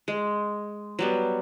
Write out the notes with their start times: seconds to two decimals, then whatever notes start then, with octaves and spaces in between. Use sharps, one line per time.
0.08 G#3
0.99 F#3 G3 B3